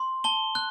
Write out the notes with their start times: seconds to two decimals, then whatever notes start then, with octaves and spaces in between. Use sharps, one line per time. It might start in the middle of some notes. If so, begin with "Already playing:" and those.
Already playing: C6
0.24 A5 G7
0.55 F#6